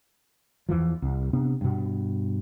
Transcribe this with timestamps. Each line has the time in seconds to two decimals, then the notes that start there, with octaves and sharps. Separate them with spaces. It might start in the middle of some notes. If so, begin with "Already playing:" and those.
0.69 E2 E3 F3
1.02 C2
1.33 C3 B3 D4
1.61 G2 B2